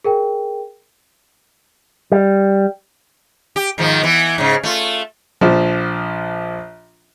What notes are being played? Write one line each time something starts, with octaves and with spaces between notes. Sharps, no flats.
G#4 A#4 G5
G3
G4
G#2 D#3 F3
E3 B3
G#2 C#3
A3 F4
A#1 F3